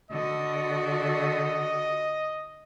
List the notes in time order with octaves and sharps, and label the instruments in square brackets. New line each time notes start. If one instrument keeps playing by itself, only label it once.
[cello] D3 F#4 [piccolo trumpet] D#5